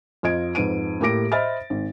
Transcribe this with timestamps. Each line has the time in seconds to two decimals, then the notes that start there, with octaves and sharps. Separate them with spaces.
0.23 F2 F4 D#5 G#6 D7
0.55 F2 G#2 B4 D7 D#7
1.01 A2 A#3 G4 D6 A#6 D7
1.32 C5 D#5 E5 B5 F6 A6
1.70 G#1